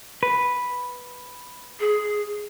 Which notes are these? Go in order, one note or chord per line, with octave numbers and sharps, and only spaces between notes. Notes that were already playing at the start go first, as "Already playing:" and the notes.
B4
G#4